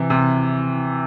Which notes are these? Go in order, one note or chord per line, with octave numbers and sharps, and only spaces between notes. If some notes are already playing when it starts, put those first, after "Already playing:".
Already playing: C3 E3
C3